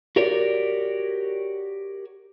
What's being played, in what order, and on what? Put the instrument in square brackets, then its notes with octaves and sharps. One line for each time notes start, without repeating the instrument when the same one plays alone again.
[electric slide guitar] F#4 G4 A#4 C#5 D5